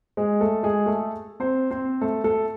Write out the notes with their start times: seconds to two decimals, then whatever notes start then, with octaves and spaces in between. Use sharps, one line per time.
0.17 G#3 G#4
0.41 A3 A4
0.63 G#3 G#4
0.86 A3 A4
1.40 C4 C5
1.71 C4 C5
2.01 A3 A4
2.24 A3 A4